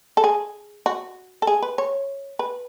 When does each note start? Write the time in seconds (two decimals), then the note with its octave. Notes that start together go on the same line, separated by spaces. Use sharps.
0.17 A4
0.24 G#4
0.86 F#4
1.42 A4
1.47 G#4
1.62 B4
1.78 C#5
2.39 B4